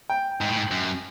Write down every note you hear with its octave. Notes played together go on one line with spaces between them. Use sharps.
G5
G#2 G5
A2
G#2
F#2